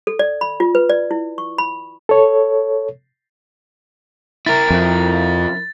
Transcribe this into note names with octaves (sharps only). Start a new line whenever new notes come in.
A4
D5
B5
F4
B4
D5
E4
C#6
B5
A4 C#5
E4 A#4 A6
F2